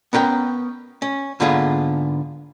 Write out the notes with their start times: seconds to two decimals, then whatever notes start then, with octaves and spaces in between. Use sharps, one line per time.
0.13 B3 C#4 A#4 G5
1.02 C#4
1.40 G#2 D3 A#3 B3 F4 G#4